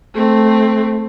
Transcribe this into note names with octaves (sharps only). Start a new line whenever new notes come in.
A3 C4